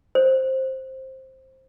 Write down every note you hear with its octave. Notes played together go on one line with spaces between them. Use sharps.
C5